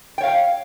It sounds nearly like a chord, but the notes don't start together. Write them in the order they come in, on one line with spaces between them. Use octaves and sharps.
G5 C#5 F5